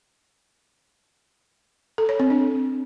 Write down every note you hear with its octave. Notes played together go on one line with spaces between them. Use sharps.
A4
C#5
C4
D4